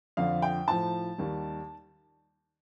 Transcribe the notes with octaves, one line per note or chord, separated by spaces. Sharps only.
F2 D3 F3 F5
G5
A2 F3 A5
D#2 D#3 G3